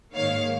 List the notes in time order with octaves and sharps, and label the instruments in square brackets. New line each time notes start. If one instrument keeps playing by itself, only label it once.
[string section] G#2 D#3 A#3 C#5 F5